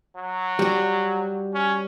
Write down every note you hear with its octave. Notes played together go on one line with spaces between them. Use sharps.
F#3
G3 F#4
C#4